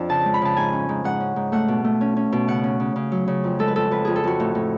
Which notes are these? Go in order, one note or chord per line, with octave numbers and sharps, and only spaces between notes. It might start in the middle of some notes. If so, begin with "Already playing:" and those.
Already playing: F2 D4
C#3 A5
G#3
B5
C#3 A5
G#2 G#5
C#4
G#2
G#2 F#5
C#4
G#2
A3 F#5
B2
A3
C#4
C#4
B2
C#3 F#5
C#4
C#3
C#3
F#3
C#3
F2
G#3 A4
B4
F2 A4
F2 B4
F2 G#4
A4
F2 F#4
A2
A2